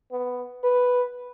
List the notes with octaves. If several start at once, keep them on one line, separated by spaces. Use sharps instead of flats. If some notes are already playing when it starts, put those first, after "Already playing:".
B3
B4